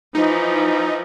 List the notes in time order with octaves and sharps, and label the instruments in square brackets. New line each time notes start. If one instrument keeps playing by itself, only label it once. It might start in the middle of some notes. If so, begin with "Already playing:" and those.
[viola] E3 F3 [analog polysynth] D#4